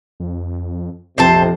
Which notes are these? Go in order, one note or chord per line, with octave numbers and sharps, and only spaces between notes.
F2
A#1 F2 C3 C4 C5 A5